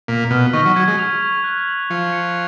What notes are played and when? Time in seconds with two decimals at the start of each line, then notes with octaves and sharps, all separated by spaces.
0.08 A#2 B6
0.30 B2 F6
0.53 D#3 C#6
0.65 F#3
0.76 F#3 G#6
0.88 G#3
0.99 F7
1.21 C#6
1.44 F#6
1.68 F#7
1.90 F3 C#7
2.13 C#7